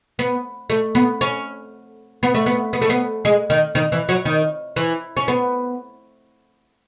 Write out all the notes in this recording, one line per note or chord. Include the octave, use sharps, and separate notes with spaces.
B3
A3
B3
C#4
B3
A3
B3
B3
A3
B3
G#3
D#3
D#3
E3
F#3
D#3
E3
C#4
B3